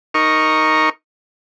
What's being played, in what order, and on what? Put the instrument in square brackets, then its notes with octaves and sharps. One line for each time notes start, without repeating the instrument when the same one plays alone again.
[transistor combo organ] D#4 A#4 C#6